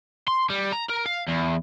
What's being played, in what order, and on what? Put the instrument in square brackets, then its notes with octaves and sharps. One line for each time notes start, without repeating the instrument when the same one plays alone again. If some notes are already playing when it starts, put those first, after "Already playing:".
[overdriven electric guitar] C6
G3
A#5
A#4
F5
E2